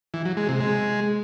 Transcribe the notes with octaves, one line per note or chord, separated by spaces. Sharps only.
E3
F#3
G#3
C3
G#3